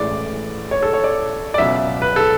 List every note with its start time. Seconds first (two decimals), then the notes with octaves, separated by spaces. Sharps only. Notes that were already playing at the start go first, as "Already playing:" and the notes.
Already playing: A1 A2 G#3 D5
0.71 C#5
0.82 A4
0.93 C#5
1.04 D5
1.54 D5
1.58 C#2 B2 F#3 B3 E5
2.02 B4
2.16 A4